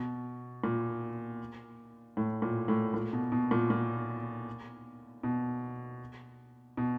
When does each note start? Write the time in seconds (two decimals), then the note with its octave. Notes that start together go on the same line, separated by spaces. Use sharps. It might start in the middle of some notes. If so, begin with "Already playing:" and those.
Already playing: B2
0.64 A#2
2.17 A2
2.42 A#2
2.68 A2
2.94 A#2
3.13 B2
3.32 B2
3.51 A#2
3.70 A#2
5.23 B2
6.77 B2